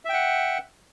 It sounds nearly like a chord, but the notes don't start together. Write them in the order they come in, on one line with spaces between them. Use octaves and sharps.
E5 G5 F#5